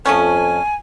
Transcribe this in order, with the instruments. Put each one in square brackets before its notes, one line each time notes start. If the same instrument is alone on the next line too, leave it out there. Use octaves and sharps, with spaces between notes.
[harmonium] F2 [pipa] F3 A3 C#4 [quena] G#5